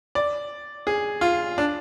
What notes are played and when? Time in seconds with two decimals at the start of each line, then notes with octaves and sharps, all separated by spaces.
0.15 D5
0.87 G#4
1.21 F4
1.58 D4